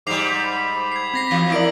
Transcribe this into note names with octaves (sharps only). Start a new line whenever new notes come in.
G#2 G3 D6 C7 F7
B5
G#6 C7
C4 G#6 A#6 C7
E2
E4 A#4 D5 D7 F#7